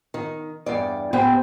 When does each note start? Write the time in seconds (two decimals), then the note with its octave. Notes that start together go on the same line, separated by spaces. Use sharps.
0.14 D#3
0.66 E2 G2 D5
1.13 A2 B3 G4 C5 G5 G#5